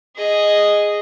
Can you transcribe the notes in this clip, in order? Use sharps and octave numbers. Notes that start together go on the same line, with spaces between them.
G#4 D#5